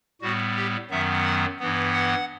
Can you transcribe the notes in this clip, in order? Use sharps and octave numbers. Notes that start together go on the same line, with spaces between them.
A2 G3 B3 F#4
G4
F#2 D#3 F#3 B3 E5
F#5
G2 E3 B3
F#5